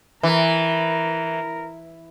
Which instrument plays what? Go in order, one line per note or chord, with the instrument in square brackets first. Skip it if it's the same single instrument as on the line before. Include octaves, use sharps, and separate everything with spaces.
[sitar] E3 [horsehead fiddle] A#4